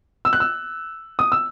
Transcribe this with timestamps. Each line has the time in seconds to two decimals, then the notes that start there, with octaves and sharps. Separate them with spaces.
0.25 E6
0.33 F#6
0.40 E6
1.19 D#6
1.32 E6